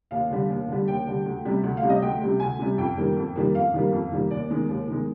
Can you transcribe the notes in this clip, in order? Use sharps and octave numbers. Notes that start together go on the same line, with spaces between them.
D#2 F5
D3 G3
D#2
D3 G3
D#2 G5
D3 G3
D2
C3 G3
D2
F5
C3 G3
D#5
D2 G5
C3 G3
D2 G#5
C3 G3
F2 G5
D#3 G3 A#3
F2
D#3 G3 A#3
F2 F5
D#3 G3 A#3
F2
D#3 G3 A#3
D#2 D5
D#3 G#3
D#2
D#3 G#3